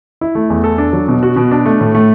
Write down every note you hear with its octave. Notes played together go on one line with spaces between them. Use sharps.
E4
A3
E2
A4
D4
F#3
B2
F#4
B2
D4
A3
A2
A3